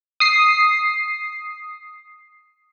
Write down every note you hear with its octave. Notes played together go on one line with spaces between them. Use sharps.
D#6 C7